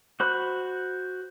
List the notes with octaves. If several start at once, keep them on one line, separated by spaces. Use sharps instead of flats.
F#4 C5 B5 F#6